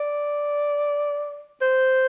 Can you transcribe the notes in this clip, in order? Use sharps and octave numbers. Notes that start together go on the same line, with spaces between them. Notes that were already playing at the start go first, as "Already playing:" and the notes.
Already playing: D5
C5